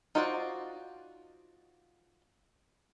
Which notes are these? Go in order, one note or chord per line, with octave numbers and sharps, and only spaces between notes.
D#4 F4 F#4 C5 D5